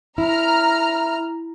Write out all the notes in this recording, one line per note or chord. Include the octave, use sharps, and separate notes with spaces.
E4 A#5 F6